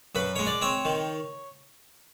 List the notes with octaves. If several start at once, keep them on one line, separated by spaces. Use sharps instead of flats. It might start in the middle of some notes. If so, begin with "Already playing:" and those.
F#2 B4
G#3 C#5
D5
C4 C#5
D#3